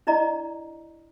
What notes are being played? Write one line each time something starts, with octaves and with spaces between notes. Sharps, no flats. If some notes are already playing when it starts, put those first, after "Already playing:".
D4 E4 D5 D#5 A#5